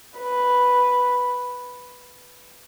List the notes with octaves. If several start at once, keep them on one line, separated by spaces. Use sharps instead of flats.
B4